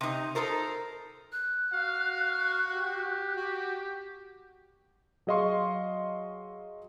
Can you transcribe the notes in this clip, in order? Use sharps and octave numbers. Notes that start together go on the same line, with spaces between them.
C3 D#4
D#4 A4 A#4 C5
F#6
F#4 F5
G4
F#4
F#3 G#4 D#5 F5 C6 C#6